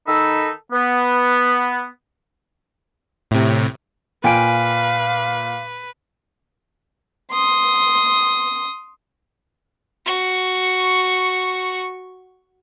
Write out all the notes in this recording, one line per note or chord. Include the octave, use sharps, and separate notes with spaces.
D#3 D#4 A4 B5 E6
B3
A2 C3
A#2 B4 F5 G5 G#5 D7
C6 D#6
F#4 C#6